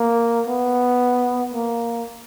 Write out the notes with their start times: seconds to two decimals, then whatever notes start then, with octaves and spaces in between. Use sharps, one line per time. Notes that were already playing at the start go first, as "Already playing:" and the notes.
Already playing: A#3
0.47 B3
1.54 A#3